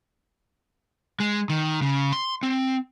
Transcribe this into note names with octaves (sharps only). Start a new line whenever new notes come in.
G#3
D#3
C#3
C6
C4